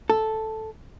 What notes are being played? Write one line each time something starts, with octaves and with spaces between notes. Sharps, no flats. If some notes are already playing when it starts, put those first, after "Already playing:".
A4